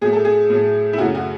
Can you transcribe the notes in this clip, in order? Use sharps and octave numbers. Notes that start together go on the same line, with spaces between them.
A2 F#3 A3 G#4
A4
G#4
A2 F#3 A3
E4
F#2 C#3 F#3 A3 F#4
F#4